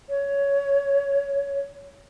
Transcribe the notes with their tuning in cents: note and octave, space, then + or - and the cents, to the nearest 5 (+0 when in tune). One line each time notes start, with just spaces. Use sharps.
C#5 +15